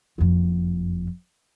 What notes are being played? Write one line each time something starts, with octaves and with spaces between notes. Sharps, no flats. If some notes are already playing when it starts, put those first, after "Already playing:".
F#1 F2